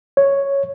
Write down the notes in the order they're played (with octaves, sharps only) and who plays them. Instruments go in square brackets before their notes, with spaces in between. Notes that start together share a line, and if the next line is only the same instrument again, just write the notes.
[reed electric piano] C#5